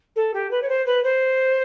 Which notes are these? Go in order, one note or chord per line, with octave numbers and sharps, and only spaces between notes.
A4
G4
B4
C#5
C5
B4
C5